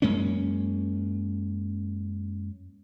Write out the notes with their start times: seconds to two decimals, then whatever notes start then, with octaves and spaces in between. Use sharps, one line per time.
0.02 F#2 G#3 A#3 C#4